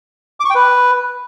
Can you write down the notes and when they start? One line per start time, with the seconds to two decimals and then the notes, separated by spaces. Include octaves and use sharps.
0.40 D6
0.45 C#6
0.50 G5
0.55 B4